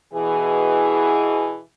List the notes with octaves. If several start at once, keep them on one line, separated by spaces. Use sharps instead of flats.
B2 E3 G#4